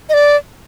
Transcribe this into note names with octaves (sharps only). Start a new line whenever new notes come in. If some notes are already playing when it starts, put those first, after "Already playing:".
D#5
D5